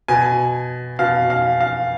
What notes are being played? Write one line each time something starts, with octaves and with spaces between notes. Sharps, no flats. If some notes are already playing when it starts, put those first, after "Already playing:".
B2 G#5
B2 F5
F5
F5